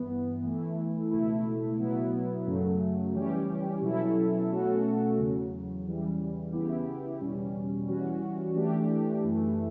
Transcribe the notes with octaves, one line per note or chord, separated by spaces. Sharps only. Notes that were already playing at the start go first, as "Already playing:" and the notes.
Already playing: G2 E3 B3
E3 A3 E4
C#2 B2 A3 E4
B2 F#3 B3 E4
F#2 C#3 F#3 A3
E3 G3 C#4 G4
B2 F#3 C#4 E4 A4
B2 A3 C#4 F#4 A4
E2 C#3 F#3
E2 C#3 E3 G3
C#3 E3 B3 E4 G4
E2 B2 G3 C#4
E3 G3 C#4 F#4
E3 A3 D4 G4
F#2 E3 A3